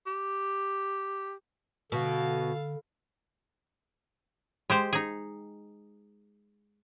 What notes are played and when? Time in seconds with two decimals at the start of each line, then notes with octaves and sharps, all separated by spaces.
0.07 G4
1.92 B2 D3 F#4 A4 F5
4.70 G#3 G4 C5
4.93 D#4 G#4